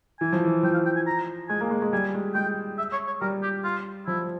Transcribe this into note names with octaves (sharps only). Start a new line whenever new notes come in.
E3 G#5
F3
E3
F3 G5
F5
G5
G#5
A#5
G#3 G#5
A#3
G#3
G#3
G3 G#5
G#3
G#3 G5
E5
C#5
C#5
G3 A#4
G4
F4
F3 E4